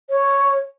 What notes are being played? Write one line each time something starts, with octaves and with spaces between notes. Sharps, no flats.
C#5